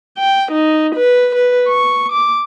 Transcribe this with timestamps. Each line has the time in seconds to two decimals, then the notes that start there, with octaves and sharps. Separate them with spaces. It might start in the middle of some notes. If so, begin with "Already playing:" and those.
0.18 G5
0.52 D#4
0.95 B4
1.35 B4
1.68 C#6
2.12 D6